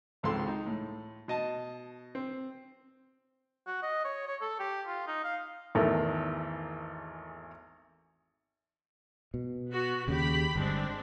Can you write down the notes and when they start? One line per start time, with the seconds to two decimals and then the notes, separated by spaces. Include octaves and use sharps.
0.23 G#1 C#2 G#2 C4 A4 C6
0.47 D#4
0.66 A2
1.28 B2 D#5 A5
2.15 C4
3.67 F#4
3.83 D#5
4.04 C#5
4.27 C#5
4.41 A4
4.60 G4
4.87 F4
5.07 D#4
5.24 F5
5.75 G#1 E2 A3 A#4
9.34 B2
9.69 B3 F#4
10.08 D#2 C#3 G4 B5
10.56 G1 G#3 C4 D4